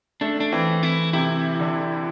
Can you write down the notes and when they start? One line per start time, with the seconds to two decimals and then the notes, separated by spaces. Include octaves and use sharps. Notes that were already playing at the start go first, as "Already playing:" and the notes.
0.21 A3 D4
0.40 D4
0.52 E3 C4
0.83 E4
1.13 C3 E4
1.60 D3